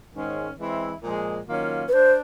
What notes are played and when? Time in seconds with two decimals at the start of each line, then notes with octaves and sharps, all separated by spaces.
0.14 G#2 D#3 G#3 C#4
0.58 E3 G#3 C4 E4
1.03 A#2 F3 G#3
1.48 D#3 F#3 A#3 C#4 F4
1.88 B4
1.93 D4 C5